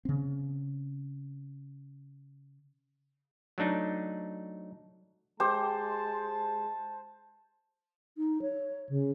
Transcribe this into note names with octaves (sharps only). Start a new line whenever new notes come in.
C#3 C4
F#3 A3 D4 D#4
G#3 G4 C5 A5
D#4
C#5
C#3